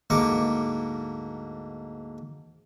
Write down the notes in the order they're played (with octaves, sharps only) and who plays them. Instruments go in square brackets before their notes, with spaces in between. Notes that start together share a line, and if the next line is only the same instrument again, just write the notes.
[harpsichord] D2 G#2 A#3 C#6 D6